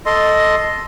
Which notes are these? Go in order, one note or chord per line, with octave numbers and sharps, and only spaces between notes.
A4 D#5 C6